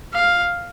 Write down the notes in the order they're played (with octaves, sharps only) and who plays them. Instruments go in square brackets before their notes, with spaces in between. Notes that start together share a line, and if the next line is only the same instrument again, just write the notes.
[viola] F5